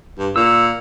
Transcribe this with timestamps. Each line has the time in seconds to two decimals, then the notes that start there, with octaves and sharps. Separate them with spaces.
0.18 G2
0.36 A#2 E6